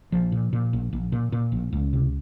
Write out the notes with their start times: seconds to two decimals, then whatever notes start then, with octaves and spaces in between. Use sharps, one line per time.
0.12 A#1 F3
0.32 A#2
0.53 A#2
0.73 A#1
0.93 A#1
1.12 A#2
1.32 A#2
1.52 A#1
1.73 C#2
1.93 C3